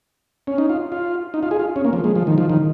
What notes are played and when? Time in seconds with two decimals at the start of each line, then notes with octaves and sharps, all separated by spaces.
0.47 C#4
0.58 D#4
0.69 F4
0.92 F4
1.34 D#4
1.43 F4
1.51 G#4
1.59 F4
1.76 C#4
1.85 A#3
1.93 F3
2.04 G#3
2.16 F3
2.27 D#3
2.38 F3
2.49 D#3